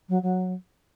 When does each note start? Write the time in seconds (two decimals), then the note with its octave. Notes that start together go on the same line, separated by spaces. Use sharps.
0.08 F#3
0.22 F#3